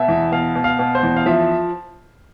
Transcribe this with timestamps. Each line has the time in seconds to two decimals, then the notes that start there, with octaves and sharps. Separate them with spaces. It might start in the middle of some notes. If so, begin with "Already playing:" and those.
Already playing: B2 E5
0.08 E2
0.32 B2 F5
0.55 B2
0.64 F5
0.79 B2
0.95 C5
1.03 E2
1.16 F5
1.26 F3 E5